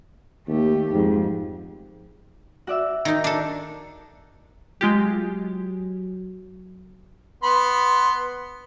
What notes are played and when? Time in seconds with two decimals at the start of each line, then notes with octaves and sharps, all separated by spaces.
0.48 D#2 A3 G4
0.92 F2 G#2
2.67 F#4 D5 E5
3.05 D#3 D#4
3.24 D4 A4
4.81 F#3 G#3 F4 G4
7.43 B3 B5 C6